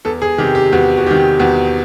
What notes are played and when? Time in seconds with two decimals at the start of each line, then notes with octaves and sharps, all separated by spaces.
0.05 E2 A4
0.22 G#4
0.38 C3 D#3 G4
0.55 G4
0.73 E2 F#4
0.97 F#4
1.06 C3 D#3 G4
1.40 E2 F#4